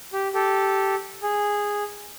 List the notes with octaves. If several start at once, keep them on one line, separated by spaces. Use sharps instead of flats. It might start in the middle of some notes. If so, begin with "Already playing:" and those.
G4
G4 A4
G#4